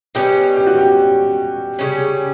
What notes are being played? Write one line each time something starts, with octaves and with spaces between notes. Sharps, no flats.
B2 G3 C#4 G4
G4
F#4
G4
C#3 G3 C#4